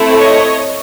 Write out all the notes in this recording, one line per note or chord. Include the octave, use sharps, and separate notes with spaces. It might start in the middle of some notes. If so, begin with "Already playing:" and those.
Already playing: A3 C4 E4 A4
C#5 D#5